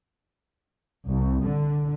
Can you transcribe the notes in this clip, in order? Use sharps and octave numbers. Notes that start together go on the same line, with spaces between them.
C2
D3